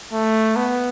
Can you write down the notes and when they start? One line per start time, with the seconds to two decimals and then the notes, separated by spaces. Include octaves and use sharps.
0.13 A3
0.56 B3